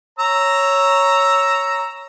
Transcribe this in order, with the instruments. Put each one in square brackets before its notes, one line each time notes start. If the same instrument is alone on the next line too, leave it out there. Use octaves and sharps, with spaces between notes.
[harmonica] C#5 A#5 E6